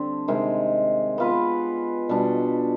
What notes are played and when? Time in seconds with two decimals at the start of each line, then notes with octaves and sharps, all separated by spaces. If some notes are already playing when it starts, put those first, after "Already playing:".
Already playing: D3 G3 C4
0.28 C3 D#3 G#3
1.18 B3 F4 B4
2.09 B2 G3 D4